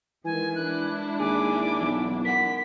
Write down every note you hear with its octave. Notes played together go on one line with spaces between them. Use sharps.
D#3 E3 G#3 G#5
G#3 D4 E4 F#6
D#2 G#4 D6
B1 F#2 E3
A#4 F#5 B6